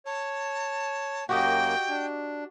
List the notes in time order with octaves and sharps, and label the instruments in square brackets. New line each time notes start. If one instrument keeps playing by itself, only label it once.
[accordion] C#5 [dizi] A5
[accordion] F#2 A#3 [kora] F#4 G4 D#5 [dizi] G5
[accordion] D4